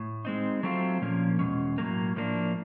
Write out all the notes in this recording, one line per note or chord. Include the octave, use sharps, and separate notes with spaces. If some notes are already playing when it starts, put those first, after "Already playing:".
Already playing: A2
G#3 C4 D#4
F#3 A3 C4 F4
A#2 F3 A#3 C#4
E2 B2 G#3 C#4
A2 F#3 A#3
A2 F3 A#3 D4